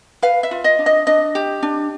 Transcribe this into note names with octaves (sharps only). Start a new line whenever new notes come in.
B4 F5
E5
F4
D#5
D4
D#5
D4 D#5
G4
D4